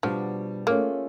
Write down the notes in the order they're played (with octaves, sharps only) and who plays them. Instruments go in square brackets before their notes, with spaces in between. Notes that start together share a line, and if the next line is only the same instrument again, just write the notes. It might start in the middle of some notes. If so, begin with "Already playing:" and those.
[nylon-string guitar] B2 G3 B3 D4 F#4 [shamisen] F3
[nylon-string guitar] A3 C#4 F4 G#4 [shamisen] A#3